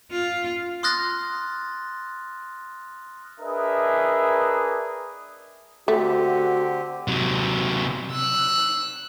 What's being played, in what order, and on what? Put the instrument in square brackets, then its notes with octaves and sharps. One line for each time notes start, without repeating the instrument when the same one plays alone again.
[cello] F4
[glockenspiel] C6 D#6 F6 F#6 A6 A#6
[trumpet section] D4 G#4 A#4 B4 D#5 E5
[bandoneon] D3 C4 G4 [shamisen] A3 [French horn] F#4
[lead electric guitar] C3 F#3
[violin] E6 F#6